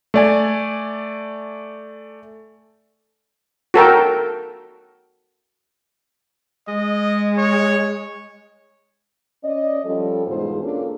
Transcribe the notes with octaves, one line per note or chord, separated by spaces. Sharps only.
A3 D5 G#5
F#4 A4 A#4 G5
G#3 D#5
C#5
C#4 D5 D#5
F3 G3 C#4 A4
E2 G#2 B2 F4 G#4 C5
A#3 C#4 D4 F4 G#4 A4